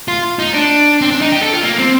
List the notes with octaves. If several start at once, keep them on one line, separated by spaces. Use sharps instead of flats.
F4
D#4
D4
C4
D4
D#4
G4
A4
F4
A#3
C4